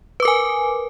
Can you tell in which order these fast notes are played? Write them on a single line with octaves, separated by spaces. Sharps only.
B4 D6 A#4 G#5